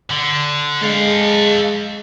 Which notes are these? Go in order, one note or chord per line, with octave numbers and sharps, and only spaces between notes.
D3
G#3 A4 F5